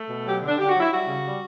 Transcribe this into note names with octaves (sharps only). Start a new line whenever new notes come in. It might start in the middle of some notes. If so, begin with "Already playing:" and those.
Already playing: A3
B2
F#3 G4
D3
D4
D3 G4
F#4
F#3
E4
G3 F#4
C#3
G3